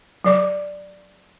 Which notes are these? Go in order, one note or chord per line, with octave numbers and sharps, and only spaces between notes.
F#3 D5 D6